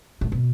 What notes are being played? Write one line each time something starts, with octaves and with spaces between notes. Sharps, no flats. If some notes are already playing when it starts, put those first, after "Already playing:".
A2
B2